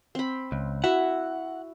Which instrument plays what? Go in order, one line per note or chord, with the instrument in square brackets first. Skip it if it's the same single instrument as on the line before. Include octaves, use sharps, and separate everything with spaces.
[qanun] C4 B5
[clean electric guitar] C#2
[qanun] E4 F#4 E5 [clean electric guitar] F#5